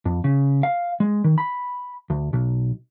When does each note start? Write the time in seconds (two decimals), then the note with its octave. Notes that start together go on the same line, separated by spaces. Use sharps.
0.06 F2
0.24 C#3
0.63 F5
1.00 G#3
1.24 D#3
1.38 B5
2.10 D2
2.33 B1